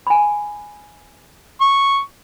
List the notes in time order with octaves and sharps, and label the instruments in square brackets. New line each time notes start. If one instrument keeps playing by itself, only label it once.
[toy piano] G#5 B5
[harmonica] C#6